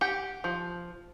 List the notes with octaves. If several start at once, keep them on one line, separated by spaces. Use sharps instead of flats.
G4 F#5
F3